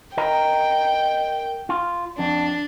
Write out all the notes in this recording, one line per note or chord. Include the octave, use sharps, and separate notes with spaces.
A#4 D#5 G5 A#5
F4
F2 D4